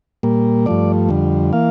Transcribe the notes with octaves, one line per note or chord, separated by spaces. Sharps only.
A#2 G3 A#3
G2 F3 A3 D5
F2 D3 G3
E3 A#3 F5